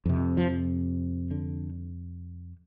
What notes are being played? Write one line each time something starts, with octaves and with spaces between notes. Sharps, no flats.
F2 C3
F3
D3